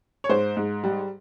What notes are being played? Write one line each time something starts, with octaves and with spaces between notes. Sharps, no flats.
C#5
G#2 C5
G#2
G3